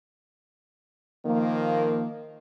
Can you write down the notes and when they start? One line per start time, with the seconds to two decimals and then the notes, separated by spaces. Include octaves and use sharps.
1.26 D#3 F3 A#3